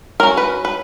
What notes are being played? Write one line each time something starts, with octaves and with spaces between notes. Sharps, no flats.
F#3 C#4 A#4
B4
B4